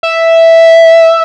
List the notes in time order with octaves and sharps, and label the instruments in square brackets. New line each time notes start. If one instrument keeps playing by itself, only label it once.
[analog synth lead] E5